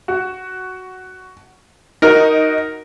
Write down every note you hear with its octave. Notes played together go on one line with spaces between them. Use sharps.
F#4
D#4 F#4 A#4